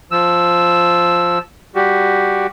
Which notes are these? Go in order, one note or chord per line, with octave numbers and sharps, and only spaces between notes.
F3 E6
G3 F#4 G4